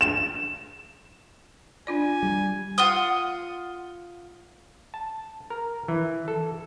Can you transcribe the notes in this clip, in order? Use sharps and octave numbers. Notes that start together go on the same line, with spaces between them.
E7
D4 F4 D5 G#5
G3
F4 F#5 C6 D#6
A5
A#4
E3
A4